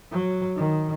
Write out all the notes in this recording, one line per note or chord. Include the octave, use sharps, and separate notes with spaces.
F#3
D#3